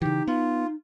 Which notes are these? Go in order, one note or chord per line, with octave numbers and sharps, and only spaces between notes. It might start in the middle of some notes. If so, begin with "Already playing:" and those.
C#3 E3 D#4 G4
B3 F4